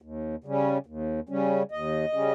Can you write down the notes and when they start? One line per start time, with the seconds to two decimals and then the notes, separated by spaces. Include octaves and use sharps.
0.02 D#2
0.44 C#3 G3 C#4
0.86 D#2
1.29 C#3 G3 C#4
1.71 D#2 D#5
2.13 C#3 G3 C#4